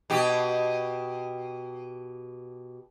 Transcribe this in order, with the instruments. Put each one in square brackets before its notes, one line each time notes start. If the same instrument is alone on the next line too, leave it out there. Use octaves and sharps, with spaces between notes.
[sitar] B2 G4